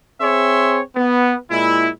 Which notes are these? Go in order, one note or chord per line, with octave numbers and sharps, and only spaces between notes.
C4 G#4 C#5 E5 C6
B3
A#2 G#3 E4